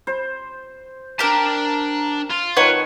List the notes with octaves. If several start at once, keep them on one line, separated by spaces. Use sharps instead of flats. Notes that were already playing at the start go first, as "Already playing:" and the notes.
C5
D4 G4 A#4 A5
F4
D#3 B4 C#5 F#5 A5